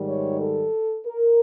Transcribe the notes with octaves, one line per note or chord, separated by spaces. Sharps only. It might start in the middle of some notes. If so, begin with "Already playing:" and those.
Already playing: G#2 D#3 G3
C#5
A4
A#4